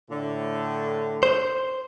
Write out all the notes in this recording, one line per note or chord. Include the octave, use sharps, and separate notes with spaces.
A2 D3
C5